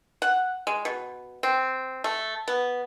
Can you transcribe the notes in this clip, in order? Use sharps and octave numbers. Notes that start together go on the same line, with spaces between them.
F#5
G#3
B2
C4
A3
B3